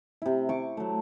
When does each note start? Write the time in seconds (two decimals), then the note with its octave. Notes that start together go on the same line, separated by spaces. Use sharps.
0.22 C3 E4
0.49 C#6 D6
0.77 F#3 A3